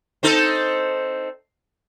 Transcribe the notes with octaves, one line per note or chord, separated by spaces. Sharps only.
C4 D#4 A4